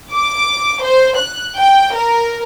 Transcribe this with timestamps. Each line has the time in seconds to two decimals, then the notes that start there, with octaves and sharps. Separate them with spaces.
0.13 D6
0.84 C5
1.18 F#6
1.58 G5
1.96 A#4